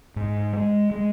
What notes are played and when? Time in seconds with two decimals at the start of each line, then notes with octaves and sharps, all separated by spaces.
0.16 G#2
0.53 G#3
0.91 G#3